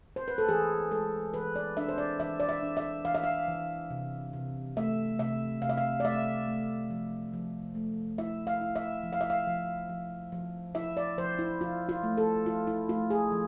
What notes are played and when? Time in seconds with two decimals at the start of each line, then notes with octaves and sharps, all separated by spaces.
0.16 C5
0.28 B4
0.38 A4
0.49 E3 G#4
0.91 G#3 A4
1.34 E3 B4
1.56 D5
1.77 D4 E5
1.89 C5
1.98 D5
2.20 E3 E5
2.40 D5
2.49 E5
2.62 D4
2.77 E5
3.05 E3 F5
3.15 E5
3.24 F5
3.48 E3
3.90 C3
4.33 C3
4.77 A3 E5
5.19 C3 E5
5.62 C3 F5
5.69 E5
5.77 F5
6.00 D5
6.04 A3 E5
6.47 A3
6.90 F3
7.33 F3
7.75 A3
8.18 E4 E5
8.47 F5
8.61 E4
8.76 E5
9.03 F3
9.13 F5
9.21 E5
9.30 F5
9.47 F3
9.89 F3
10.32 F3
10.75 E4 E5
10.97 D5
11.18 F3 C5
11.39 E4
11.61 F3 F4
11.89 F4
12.03 A3
12.18 A4
12.46 E4 F4
12.67 E4
12.89 A3 F4
13.10 G#4
13.32 F3